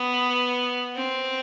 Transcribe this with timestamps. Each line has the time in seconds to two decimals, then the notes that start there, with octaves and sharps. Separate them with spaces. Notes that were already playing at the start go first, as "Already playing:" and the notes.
Already playing: B3
0.95 C4